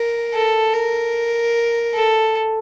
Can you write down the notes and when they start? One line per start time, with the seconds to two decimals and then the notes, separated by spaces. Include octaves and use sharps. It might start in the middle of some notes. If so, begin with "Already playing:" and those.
Already playing: A#4
0.33 A4
0.74 A#4
1.95 A4